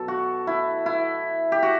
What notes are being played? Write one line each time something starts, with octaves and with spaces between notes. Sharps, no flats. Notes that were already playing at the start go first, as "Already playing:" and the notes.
Already playing: B2 F#3 A4
F#4
E4
E4
G4
F#4